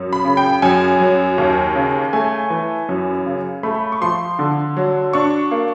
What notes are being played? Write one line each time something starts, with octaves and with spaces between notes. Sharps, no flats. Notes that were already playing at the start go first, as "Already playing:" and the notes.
Already playing: F#2
B5
C#3
G5
F#2 G#5
F#3
D#2
C#3
A3 G#5
E3
F#2
C#3
A3 B5
C#6
F3 C6
D3
F#3
D4 C#6
A#3